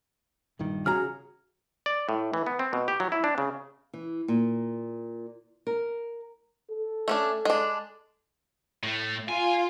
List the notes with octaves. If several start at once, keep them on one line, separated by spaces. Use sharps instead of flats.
A#1 G2 D#3
C#3 F#4 G#4 A#5 F6
D5
A2
E3
B3
C4
B2
G4
F#3
E4
D4
C#3
E3
A#2
A#4
A4
A3 C#4 D4
G#3 D4
A2 A3
F4 G#5